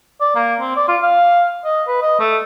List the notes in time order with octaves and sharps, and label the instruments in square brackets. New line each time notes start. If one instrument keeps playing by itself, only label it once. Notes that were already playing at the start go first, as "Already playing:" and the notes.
[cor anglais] D5
A#3
C4
D5
F4
F5
D#5
B4
D#5
A3